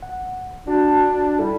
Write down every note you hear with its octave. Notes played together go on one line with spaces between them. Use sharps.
F#5
D4 F#4
G3 E4 A4